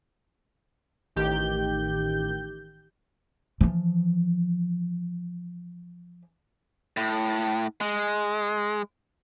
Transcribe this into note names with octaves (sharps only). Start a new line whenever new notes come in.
A1 D#3 G4 G6
E3 F3
A2
G#3